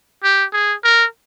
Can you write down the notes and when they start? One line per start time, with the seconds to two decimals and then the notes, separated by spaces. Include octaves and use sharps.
0.23 G4
0.53 G#4
0.84 A#4